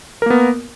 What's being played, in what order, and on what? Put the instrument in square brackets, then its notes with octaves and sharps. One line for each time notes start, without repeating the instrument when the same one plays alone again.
[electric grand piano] A#4
A#3
B3